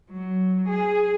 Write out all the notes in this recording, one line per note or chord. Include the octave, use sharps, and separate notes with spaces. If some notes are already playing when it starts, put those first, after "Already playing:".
F#3
G#4